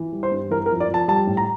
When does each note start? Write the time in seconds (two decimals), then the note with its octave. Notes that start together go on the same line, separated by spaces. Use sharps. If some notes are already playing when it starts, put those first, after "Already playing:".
Already playing: E3
0.12 G3
0.23 C5
0.32 G2
0.51 E3 A#4
0.66 A#4
0.70 F2
0.80 D5
0.89 F2
0.94 A5
1.08 G3 A5
1.27 A2
1.37 A#5